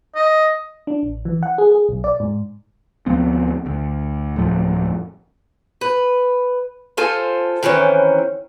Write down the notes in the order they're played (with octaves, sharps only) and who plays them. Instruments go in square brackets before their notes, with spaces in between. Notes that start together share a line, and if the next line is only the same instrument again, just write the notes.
[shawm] D#5
[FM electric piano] D4
A1
E3
F#5
G#4
G#4
B1
D5
G#2
[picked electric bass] D2 F3 B3 C4
D2
D1 F2 A2 F3
[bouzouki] B4
F4 A4 C5 G#5
D#3 E3 C4 C#4